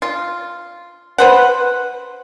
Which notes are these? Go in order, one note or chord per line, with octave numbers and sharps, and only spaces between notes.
F4
B4 C5 F#5